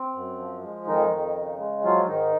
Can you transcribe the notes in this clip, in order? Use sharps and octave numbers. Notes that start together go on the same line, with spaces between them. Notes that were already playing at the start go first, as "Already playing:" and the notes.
Already playing: C4
F#2
F3
G#3
F2 D#3 D#4
F2
C#3
G#3
F3 F#3 F4
G#2 D#3 D#4